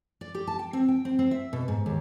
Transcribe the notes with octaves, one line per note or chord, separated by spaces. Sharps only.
D5
G4
A5
G5
C4
G5
C4
C4
E5
B2
G#2
D#2